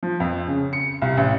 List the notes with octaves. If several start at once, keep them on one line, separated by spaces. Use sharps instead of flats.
F3
F2
C#3
C#7
C2
A1